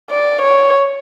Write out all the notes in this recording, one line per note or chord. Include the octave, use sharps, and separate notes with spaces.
D5
C#5